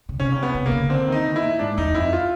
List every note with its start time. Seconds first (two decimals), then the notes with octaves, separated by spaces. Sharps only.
0.09 C#3
0.19 C3 C#4
0.32 C#3
0.36 C3
0.43 B3
0.55 C3
0.66 A#3
0.71 C#3
0.89 D3 C4
1.08 D#3 D#4
1.25 B2
1.36 E4
1.42 A#2
1.59 G#2 D4
1.77 E2 D#4
1.95 F2 E4
2.13 F4